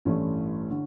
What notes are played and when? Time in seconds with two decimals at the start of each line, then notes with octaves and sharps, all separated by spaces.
0.05 A1 G2 E3 A3 C#4
0.70 D3